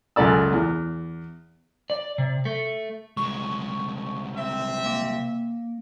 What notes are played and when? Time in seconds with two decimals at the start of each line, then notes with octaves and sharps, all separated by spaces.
0.16 C#2 F#2 A3 D5 E6
0.52 E2
1.90 D5
2.18 C3
2.45 A3
3.17 C2 G#3 C#6
4.36 C4 E5
4.86 A#3